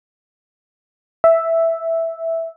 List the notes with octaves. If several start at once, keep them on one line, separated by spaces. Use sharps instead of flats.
E5